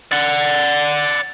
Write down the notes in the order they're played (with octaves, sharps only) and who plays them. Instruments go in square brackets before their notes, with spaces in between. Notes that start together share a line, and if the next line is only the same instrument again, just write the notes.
[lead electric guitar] D5 F#5